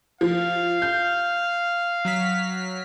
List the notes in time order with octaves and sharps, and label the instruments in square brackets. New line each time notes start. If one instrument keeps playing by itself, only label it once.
[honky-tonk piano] F3 [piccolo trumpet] F5
[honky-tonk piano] G6
[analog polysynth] F#3 F6 B6